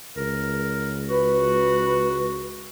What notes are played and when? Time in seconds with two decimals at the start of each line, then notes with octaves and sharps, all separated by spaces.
0.17 C#2 A#4
1.09 F#4 B4